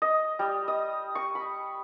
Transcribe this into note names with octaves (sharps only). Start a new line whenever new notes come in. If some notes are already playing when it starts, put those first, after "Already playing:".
D#5
G3
D#5
C#6
B5